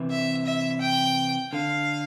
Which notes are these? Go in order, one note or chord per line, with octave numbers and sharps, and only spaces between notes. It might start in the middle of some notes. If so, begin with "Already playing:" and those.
Already playing: C3 E3
E5
E5
G5
D3 F5